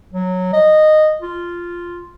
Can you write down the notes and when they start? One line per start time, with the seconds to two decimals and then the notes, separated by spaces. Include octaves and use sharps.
0.12 F#3
0.53 D#5
1.22 F4